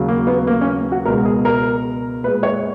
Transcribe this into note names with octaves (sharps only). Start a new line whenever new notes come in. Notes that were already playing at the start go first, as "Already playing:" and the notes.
Already playing: D#2 C#3 F#3
A#3
B3
A#3
C#4
F#4
C#2 B2 G#3 A#4
G#4
A#4
A#2 G#3 B4
C#5